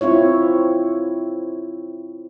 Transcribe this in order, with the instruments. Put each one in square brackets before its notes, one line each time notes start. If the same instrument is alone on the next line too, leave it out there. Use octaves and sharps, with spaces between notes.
[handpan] C4 E4 F4 C#5